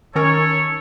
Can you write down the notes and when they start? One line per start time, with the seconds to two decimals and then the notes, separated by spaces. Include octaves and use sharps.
0.15 D#3 C#4 A4 A#4 C#5